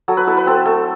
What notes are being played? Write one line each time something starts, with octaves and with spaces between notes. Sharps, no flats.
F#3 A4
B4
E4 A4
B4
C4 A4
A3 A4